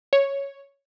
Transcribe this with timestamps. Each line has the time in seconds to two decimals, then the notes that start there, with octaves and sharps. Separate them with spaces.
0.13 C#5